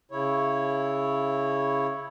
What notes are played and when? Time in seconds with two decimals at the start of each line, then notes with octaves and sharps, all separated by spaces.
0.11 C#3 E4 C#5